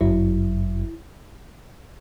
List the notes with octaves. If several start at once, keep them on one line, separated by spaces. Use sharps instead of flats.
G1 F#2 F#3 E4